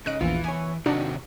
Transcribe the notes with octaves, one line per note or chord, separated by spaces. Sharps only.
G#2 C#3 D#5 F#6 D7
A#1 E2 E3 F4
B3 C#5 G#5
C3 D#3 D4 D#4 F#4